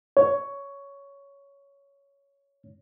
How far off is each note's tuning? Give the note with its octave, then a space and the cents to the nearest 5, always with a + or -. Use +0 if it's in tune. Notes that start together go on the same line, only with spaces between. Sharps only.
C#5 +10